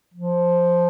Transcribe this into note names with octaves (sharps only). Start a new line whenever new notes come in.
F3